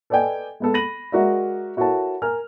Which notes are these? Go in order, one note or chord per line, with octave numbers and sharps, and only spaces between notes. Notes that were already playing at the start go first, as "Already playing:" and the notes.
A4 B4 D5 D#5 G5 G#5
G#3 B3 A4
B5 A#6 D#7 F#7
G#3 F#4 A#4 D5 E5
E4 F#4 A4 A#4 C#5 A5
A#4 G#5 F6